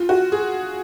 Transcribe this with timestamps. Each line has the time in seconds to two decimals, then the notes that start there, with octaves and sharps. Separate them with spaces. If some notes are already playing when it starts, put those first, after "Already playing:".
Already playing: F4
0.09 F#4
0.32 G#4